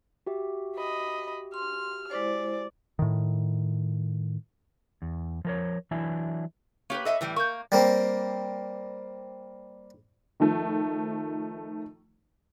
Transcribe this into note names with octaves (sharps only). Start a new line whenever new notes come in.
F#4 G4 E5
D#5 B5
C6 F6
G#3 E4 C5 D5
A2 D#3
E2
F3 A#4 C#5
E3 F#3 D4 E4 E5 G#5
A#3 G4 B4 C#5
A4 D#5 E5
A2 E3 G3
A#3 C#6 G6
G3 A#3 C4
D#3 F3 A3